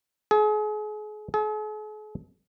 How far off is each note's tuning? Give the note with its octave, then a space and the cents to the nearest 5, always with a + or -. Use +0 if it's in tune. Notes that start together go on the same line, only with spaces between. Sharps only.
G#4 +35
G#4 +45